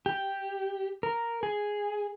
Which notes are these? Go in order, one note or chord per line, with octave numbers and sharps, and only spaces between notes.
G4
A#4
G#4